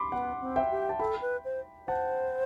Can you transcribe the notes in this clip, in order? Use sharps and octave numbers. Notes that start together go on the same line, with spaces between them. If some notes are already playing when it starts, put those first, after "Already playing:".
Already playing: B5 C6 D6
B3 F#5
C4
E5 G5
G4
A5
A4 G5 B5
B4
C5
C5 F#5 A5